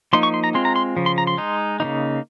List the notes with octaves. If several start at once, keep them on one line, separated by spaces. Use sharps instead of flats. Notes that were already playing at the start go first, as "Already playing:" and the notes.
F3 A#3 D#4 C6
C#6
C6
A#5
G#3 C4 F4 C6
A#5
C6
C#3 F3
C6
A#5
C6
G#3 D#4
C#3 F3 A#3 D#4